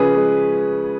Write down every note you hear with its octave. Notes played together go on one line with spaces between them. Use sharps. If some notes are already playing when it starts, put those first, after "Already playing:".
Already playing: C#3 F3 C#4 G#4 B4
G#3